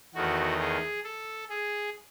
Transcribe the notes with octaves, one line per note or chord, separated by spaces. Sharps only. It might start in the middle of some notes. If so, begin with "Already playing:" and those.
E2 D#3 A3 F#4
G#4
A4
G#4